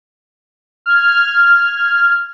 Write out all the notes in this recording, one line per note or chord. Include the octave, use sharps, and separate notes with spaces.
F6 G#6